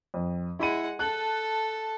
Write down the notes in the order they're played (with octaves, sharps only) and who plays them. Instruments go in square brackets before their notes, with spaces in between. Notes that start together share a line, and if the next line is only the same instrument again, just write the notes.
[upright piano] F2
[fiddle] G#3 F#5 [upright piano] E4 B5 D#7
[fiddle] A4 A5 [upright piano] F#6 F#7